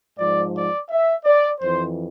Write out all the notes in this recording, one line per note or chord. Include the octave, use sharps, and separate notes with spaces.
G#2 F3 D5
D5
E5
D5
F2 E3 C5